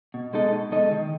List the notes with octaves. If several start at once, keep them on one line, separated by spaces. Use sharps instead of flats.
B2
G#3 D#4 A4 D#5
B2
G#3 D#4 A4 D#5
D#3